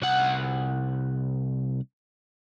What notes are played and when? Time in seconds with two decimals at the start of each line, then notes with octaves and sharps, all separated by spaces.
0.02 C2 F#5